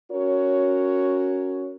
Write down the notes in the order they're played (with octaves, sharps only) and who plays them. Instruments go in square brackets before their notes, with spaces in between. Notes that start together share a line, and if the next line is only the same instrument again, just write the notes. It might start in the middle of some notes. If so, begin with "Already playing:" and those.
[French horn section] C#4 F#4 A#4 C#5